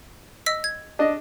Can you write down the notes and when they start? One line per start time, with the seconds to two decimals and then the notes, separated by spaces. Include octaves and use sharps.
0.46 D#5 E6 B6
0.64 G#6
0.99 D4 D#5